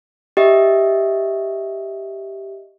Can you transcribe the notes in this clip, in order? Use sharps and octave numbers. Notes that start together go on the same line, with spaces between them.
G4 D#5 E5